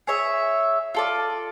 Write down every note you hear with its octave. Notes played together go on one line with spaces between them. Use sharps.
G#4 C#5 E5
F4 A4 D5